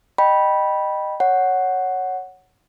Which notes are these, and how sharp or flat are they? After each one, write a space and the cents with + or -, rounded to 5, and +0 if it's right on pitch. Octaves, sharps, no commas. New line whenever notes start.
D#5 -20 G5 -10 B5 -15
C#5 +0 F#5 +0